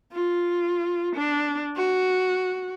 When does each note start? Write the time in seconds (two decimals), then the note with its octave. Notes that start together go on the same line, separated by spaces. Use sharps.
0.13 F4
1.15 D4
1.76 F#4